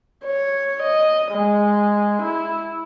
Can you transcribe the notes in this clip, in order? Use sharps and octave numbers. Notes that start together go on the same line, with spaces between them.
C#5
D#5
G#3
E4